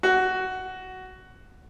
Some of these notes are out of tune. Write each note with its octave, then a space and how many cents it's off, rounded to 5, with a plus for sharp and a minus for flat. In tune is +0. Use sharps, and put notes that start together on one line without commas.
F#4 +10